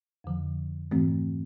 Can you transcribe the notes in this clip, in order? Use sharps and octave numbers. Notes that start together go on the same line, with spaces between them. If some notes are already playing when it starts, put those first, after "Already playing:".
F2 D3 F3
G#2 E3 A3 C4